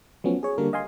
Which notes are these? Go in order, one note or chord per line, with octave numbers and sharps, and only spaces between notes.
F3 F#3 A3 B3 C#4
G#4 C#5
D3 G3 A#3 D4 A#4
D#5 F5 G#5 C6